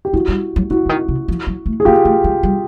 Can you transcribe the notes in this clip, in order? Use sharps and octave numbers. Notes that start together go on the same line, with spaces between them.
G4
F3 E4 F#4
G3
F#3
E3 E4 F#4
D3
D#3
C3
F3
F#3
A3
G#4
A#3 F4 G4
A3
G#3
G3